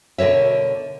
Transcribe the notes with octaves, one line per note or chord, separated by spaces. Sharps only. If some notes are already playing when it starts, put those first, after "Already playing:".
B2 D3 A#4 C#5 E5